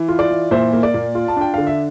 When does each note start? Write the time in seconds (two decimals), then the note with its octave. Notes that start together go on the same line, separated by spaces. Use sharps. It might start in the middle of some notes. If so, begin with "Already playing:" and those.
Already playing: E3
0.08 F4
0.19 D5
0.31 E3
0.51 A#2 C5 E5
0.73 A#3
0.83 D5
0.94 A#2
1.15 F4
1.28 A5
1.36 D4 G5
1.54 D3 F5
1.67 E5